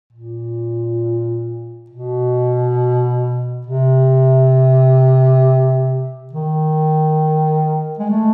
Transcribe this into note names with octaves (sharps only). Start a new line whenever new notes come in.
A#2
B2
C3
D#3
G#3
A3